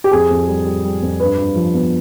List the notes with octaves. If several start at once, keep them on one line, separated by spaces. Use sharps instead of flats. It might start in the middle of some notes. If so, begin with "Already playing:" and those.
G4
F2 G#4
F2
G3
G3
G3
F2
G2 B4
G2
F3
B3